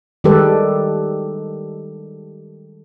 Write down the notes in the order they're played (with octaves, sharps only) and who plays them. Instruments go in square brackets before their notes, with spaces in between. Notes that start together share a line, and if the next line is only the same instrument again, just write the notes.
[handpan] D#3 G3 G#3 G4 A4 B4